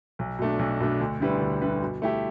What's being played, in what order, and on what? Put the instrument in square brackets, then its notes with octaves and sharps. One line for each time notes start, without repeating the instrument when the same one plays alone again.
[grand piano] B1
B2 A3 D4
B1
B2 A3 D4
D2
D3 G3 E4 B4
D2
D3 G3 E4 B4
B2
A3 E4 G4